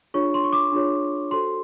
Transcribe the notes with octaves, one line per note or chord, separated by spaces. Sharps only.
D4 F4 G#4 C#5 C#6
C6
C#6
D6
D4 F4 G#4 C#5
F#4 A4 C5 C6